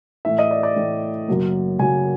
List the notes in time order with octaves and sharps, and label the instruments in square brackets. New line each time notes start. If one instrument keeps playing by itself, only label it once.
[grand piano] A2 E3 A3 E5
D#5
D5
D5
A2 E3 A3
F#2 C#3 F#3 A#3
F#2 C#3 F#3 A#3 G#5